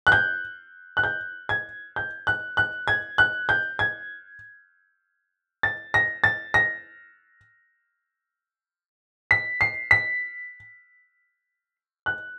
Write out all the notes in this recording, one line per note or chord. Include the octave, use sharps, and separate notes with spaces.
F#6
G6
F#6
G6
G#6
G6
F#6
F#6
G#6
F#6
G6
G#6
A6
A#6
A6
A#6
B6
C7
B6
F#6